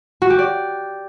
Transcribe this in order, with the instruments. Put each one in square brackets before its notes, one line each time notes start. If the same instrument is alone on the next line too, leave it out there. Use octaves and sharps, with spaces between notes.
[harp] F#4
G4
D5